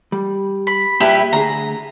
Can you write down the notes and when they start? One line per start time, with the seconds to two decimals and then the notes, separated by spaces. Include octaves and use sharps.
0.12 G3
0.67 B5
1.00 A#2 G3 E4 G4 B4 A5
1.33 D2 G#4 A#5